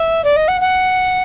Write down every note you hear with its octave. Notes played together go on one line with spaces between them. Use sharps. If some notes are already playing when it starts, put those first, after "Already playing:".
Already playing: E5
D5
D#5
F#5
F#5